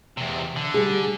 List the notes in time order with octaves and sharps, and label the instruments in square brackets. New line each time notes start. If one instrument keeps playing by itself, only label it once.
[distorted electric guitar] E2 C3
D3
[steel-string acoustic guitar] G3 G#4